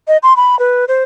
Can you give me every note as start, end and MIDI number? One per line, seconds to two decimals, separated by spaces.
0.08 0.17 75
0.23 0.36 84
0.36 0.58 83
0.59 0.85 71
0.88 1.03 72